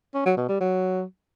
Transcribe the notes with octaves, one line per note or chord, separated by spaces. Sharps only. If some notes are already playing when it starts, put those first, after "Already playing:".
C#4
F#3
B2
G3
F#3